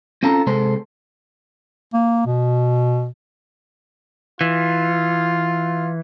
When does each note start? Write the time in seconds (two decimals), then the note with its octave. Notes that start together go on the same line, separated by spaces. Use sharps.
0.23 C4 C#4 F4 A4 A5 A#5
0.47 C3 G#3 A4 C5
1.93 A#3
2.26 B2
4.41 E3 F4